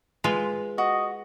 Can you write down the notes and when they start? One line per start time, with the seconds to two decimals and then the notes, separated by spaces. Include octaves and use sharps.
0.24 G#3 F4 B4
0.78 F#4 D#5